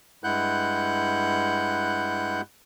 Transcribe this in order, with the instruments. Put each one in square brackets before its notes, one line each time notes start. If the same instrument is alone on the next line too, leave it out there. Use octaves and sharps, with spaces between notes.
[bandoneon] G2 G#3 E4 F#5 F#6 G6